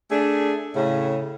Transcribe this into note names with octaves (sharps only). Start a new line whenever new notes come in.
A3 D4 G#4
A2 C#3